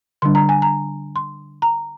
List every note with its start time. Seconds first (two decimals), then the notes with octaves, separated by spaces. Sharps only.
0.22 D3 G3 D4 C6
0.35 A#5
0.49 G#5
0.62 A#5
1.16 C6
1.62 A#5